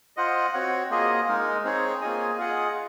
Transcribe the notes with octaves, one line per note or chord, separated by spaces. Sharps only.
F4 C5 D#5 F#5
C4 F#4 C#5 F#5
A#3 F4 G#4 D#5
G#3 D#4 A#4
C4 D#4 G#4 C#5
A#3 F4 G#4 D#5 G#5
F4 G#4 D#5 F#5